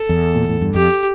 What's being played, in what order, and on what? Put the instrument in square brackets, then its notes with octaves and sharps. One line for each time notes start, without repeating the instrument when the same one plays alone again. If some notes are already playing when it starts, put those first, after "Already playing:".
Already playing: [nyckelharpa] A4
[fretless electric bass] E2
A#2
A2
G2
[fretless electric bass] F2 [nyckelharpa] G4